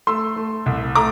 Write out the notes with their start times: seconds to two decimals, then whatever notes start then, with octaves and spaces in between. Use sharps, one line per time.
0.07 A3 C6 E6
0.36 A3
0.66 C2
0.95 A3 A#5 D6